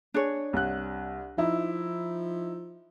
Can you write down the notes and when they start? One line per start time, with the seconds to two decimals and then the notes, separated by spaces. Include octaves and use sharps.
0.14 D4 G#4 C#5
0.53 C2 F#6
1.38 F3 D#4 E4